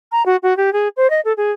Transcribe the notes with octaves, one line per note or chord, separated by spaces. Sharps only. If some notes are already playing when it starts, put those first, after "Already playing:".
A#5
F#4
F#4
G4
G#4
C5
D#5
A4
G#4